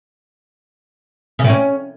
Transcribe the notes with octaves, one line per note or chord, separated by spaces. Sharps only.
C#3
A2
C#4